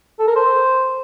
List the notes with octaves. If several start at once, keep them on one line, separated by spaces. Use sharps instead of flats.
A4
A#4
C5